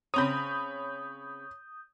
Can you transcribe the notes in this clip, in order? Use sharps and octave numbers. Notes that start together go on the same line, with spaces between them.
C#3 C4 C#5 A#5 B5 D#6 G6